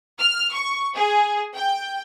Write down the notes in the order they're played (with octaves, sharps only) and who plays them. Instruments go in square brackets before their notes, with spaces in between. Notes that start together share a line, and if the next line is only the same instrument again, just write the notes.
[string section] F6
C#6
G#4
G5